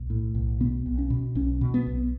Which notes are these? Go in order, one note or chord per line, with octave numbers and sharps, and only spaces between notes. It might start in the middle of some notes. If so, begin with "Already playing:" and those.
Already playing: B1
A2
B1
B2 B3
B1
C#4
B2
B1 C#4
B2
B3
B1